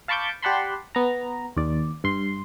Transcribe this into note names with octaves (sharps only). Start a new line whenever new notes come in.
F5 A5 B5 C#6 D6 G6
G4 D5 F#5 A5 B5 C6
B3 A#5
D#2 D5
G2 C6